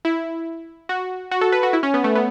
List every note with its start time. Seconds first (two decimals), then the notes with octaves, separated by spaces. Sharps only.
0.05 E4
0.89 F#4
1.31 F#4
1.41 A4
1.52 B4
1.63 F#4
1.73 E4
1.83 C#4
1.94 B3
2.04 A3
2.15 B3